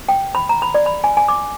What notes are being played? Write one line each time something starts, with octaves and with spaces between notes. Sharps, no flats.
G5
B5
A#5
B5
D5
B5
G#5
G#5
D6